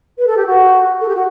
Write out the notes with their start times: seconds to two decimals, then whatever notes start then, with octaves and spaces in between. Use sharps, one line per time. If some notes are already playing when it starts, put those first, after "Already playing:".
0.18 B4
0.26 A4
0.36 G4
0.46 F#4
1.00 A4
1.07 G4
1.14 F#4